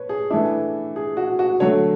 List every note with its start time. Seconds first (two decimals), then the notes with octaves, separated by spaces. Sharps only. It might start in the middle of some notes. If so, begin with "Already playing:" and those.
Already playing: B4 C#5
0.09 G#4
0.31 E3 A3 D4 E4
0.96 G#4
1.17 F#4
1.39 F#4
1.60 D3 F#3 A3 C#5